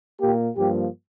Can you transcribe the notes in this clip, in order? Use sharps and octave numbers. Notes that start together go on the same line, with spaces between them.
A#2 A#3 G4
G2 F3 A#3 G4